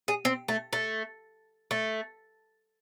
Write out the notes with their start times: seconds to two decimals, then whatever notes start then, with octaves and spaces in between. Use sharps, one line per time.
0.08 G#4
0.25 C4
0.48 A3
0.73 A3
1.71 A3